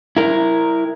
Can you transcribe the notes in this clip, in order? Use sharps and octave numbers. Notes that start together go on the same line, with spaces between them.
E4 A#4